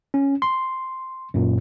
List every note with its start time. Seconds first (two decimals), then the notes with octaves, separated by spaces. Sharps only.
0.14 C#4
0.42 C6
1.34 F#2 A#2